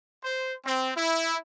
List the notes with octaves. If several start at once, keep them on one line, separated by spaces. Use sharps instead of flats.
C5
C4
E4